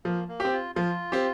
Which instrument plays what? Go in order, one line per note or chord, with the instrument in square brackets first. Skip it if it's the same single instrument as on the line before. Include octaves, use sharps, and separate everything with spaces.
[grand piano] F3 [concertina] A#3
[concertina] A#3
[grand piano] G4
C4
[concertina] F4
[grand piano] F3 [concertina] F4
[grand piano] C4 G4